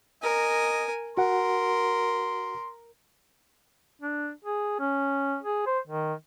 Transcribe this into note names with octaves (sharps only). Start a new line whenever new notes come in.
A#4 D#5 G#5
F#4 A#4 F#5 C6
D4
G#4
C#4
G#4
C5
D#3